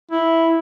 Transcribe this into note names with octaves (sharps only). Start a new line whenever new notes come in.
E4